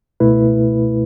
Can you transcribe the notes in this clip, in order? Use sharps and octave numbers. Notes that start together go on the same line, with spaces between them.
C#2 B2 A3 E4 B4